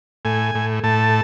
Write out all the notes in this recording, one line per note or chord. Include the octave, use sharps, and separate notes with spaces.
A2 G#5
A2
A2 A5